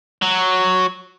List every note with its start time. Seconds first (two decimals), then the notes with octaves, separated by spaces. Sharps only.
0.22 F#3